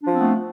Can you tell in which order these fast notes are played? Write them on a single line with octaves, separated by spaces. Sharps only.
D4 F3 C4 B3 A3